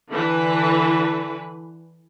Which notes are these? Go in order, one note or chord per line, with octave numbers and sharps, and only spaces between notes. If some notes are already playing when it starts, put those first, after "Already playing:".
D3 E3 B4